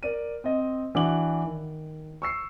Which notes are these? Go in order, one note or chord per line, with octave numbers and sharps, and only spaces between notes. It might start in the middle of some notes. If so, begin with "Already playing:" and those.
A#4 D5 D#7
C4 D#5
E3 D4 F#4 F#5 D6 F#7
D#3
C#6 E6 C7